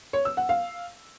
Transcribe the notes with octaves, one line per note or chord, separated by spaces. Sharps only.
C#5
E6
F#5
F5